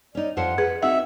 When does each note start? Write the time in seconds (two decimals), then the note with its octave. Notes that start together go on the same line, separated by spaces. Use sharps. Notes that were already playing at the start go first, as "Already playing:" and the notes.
0.15 C#4 D#4 D5
0.37 F2 F3 C5 F#5
0.58 G#4 B4
0.83 C4 D#4 F#4 E5 F#5